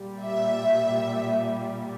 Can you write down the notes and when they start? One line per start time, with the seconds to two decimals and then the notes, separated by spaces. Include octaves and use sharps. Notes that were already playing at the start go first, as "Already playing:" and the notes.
Already playing: A#2 G3
0.23 E5